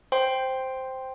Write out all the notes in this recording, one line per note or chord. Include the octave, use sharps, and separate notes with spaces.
C5 G5 C6